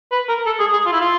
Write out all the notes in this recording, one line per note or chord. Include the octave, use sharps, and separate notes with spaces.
B4
A#4
A4
G#4
G#4
F4
E4
F4